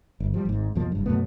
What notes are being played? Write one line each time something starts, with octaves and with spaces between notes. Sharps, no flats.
G1
F3 G3
G#1 G#2
B1 F2 F3 A#3
F#1 G2
F#2 B2 A3 B3